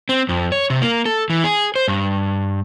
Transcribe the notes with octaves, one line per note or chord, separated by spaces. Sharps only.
C4
F2
C#5
C3
A#3
A4
E3
G#4
C5
G2